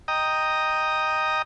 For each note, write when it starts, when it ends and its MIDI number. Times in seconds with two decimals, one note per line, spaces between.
0.08 1.42 75
0.08 1.42 79
0.08 1.42 82
0.08 1.42 87